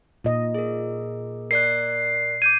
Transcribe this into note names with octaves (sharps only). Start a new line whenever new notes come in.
A#2 D#5
G#4 A#4
A#4 D5 F#6 C7
D6 G6 G#6 D#7